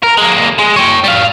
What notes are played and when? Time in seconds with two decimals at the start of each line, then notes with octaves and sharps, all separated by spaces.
0.03 A#4
0.18 G#3 A#3
0.58 G#3
0.76 C#5 G5
1.04 G3 F5